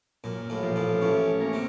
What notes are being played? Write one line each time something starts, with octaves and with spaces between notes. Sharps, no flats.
F#2 A#2
A1 A2
F3
A1 A2
A1 A2 C#4
A#3
C3